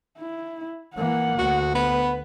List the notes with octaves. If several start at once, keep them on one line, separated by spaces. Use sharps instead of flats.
E4
E3 A#3 F#5
D2 F#4
B3 B4